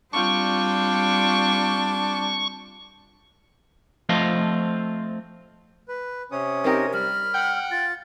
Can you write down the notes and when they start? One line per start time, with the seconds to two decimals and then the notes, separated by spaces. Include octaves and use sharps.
0.13 G3 C4 D4 F4 G5 C#6
4.09 F3 A3 C4 F4 D#5 F5
5.88 B4
6.32 C3 C#4 D#6
6.64 C4 D#4 G4 A#4
6.93 G3 B5 F6
7.35 F#5 G5
7.72 F4 A6